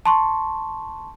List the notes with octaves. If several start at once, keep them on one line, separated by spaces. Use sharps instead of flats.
A5 C6 C#6